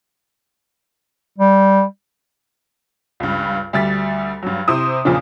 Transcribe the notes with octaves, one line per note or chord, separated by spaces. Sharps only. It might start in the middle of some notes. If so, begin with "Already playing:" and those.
G3
C#2 G2
D2 G3 A6 B6
G2 F#3
C3 E4 C5 D#6
E2 A#2 C#3 F3 D4